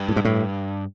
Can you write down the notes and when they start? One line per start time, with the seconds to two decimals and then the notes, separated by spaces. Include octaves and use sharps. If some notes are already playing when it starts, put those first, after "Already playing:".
Already playing: G2
0.09 A2
0.16 G#2
0.25 A2